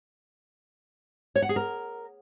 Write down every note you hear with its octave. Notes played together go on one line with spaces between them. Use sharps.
C#5
F#5
G#4
A#4